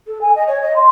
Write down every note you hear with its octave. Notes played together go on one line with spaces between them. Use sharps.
A4
G#5
D#5
C#5
D#5
C6